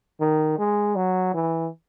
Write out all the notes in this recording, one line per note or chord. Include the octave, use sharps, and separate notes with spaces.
D#3
G#3
F#3
E3